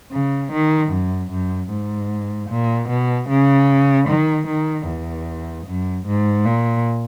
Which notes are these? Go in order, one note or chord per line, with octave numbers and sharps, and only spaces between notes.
C#3
D#3
F#2
F#2
G#2
A#2
B2
C#3
D#3
D#3
E2
F#2
G#2
A#2